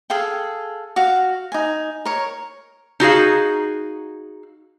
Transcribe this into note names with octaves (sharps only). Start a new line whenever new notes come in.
G#4 A4 F5 G5
F#4 F5
D#4 G#5
A#4 C#5
D#4 F#4 G#4 F5